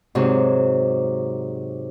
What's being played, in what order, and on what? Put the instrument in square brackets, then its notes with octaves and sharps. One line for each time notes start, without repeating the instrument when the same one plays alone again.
[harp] G#2 C3 F#3